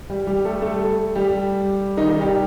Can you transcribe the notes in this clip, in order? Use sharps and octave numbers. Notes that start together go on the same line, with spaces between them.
G3 G4
G3 G4
A3 A4
A3 A4
G3 G4
D#3 D#4
D#3 D#4
G3 G4